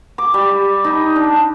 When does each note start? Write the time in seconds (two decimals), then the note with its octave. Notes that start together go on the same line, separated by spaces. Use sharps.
0.18 D6
0.34 G3
0.84 D#4
1.16 D4